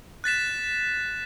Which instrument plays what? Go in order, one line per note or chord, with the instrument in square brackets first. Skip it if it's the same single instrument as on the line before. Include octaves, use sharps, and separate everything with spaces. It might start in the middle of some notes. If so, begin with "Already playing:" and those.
[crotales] F#6 A6 B6 E7